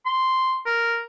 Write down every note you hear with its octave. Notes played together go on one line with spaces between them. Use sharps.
C6
A#4